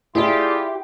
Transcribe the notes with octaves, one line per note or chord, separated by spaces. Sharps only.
E4 F4 G4 G#4 D5 G5